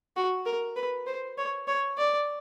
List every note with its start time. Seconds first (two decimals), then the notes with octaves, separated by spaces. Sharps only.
0.16 F#4
0.46 A#4
0.76 B4
1.07 C5
1.38 C#5
1.68 C#5
1.98 D5